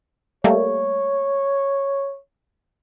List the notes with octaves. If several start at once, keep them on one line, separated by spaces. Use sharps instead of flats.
G3 A3 A#3 C#5